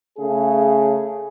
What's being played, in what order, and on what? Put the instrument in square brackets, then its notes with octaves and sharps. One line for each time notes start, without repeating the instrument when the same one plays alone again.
[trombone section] C#3 A3 G#4